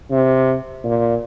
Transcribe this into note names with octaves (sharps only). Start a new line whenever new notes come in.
C3
A#2